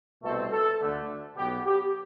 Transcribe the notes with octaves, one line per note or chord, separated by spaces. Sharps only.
C2 B2 A3 C4 A4
A4
D2 D3 A3
B1 B2 B3 G4
G4